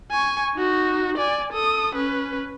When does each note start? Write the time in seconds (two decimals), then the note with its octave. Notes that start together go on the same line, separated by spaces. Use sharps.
0.11 G#5 C#6
0.55 D#4 F#4
1.18 D5 G#5
1.52 A4 D#6
1.95 C#4 B4